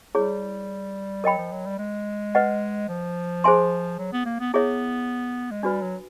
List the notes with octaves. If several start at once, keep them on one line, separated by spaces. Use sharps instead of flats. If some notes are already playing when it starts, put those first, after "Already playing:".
G3 E4 G#4 C#5
F#3 A#4 D#5 G5 B5
F3
F#3
G3
G#3
B4 D#5 F#5
F3
G#4 C5 E5 G#5 C6
F#3
B3
A#3
B3
B3 E4 G#4 C#5 E5
G#3
G3 D4 F#4 B4
F#3